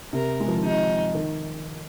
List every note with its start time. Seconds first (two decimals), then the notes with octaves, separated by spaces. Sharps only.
0.13 C3 A#4
0.40 G#3
0.48 F3
0.56 D#3
0.64 C3 D#4
1.14 D#3